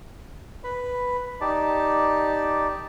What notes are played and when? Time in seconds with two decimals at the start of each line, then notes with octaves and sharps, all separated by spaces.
0.64 B4 B5
1.41 D#4 G4 D5 A5